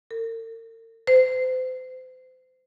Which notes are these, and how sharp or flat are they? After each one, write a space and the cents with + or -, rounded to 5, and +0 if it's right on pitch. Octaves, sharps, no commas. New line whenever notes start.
A#4 -45
C5 -35